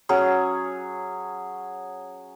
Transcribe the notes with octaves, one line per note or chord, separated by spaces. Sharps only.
F#3 C#4 G#4